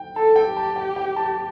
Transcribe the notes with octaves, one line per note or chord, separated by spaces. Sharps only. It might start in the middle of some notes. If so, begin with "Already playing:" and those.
Already playing: G5
A4 A5
G5
G4
A5
G5
G5
A5